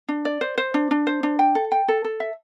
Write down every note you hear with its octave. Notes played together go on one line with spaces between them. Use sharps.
D4
D5
C5
C5
D4
D4
C5
D4
G5
A4
G5
A4
A4
E5